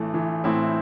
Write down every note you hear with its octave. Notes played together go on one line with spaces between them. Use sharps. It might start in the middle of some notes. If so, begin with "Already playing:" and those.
Already playing: A1 E3 A3
E3
A2 C4 E4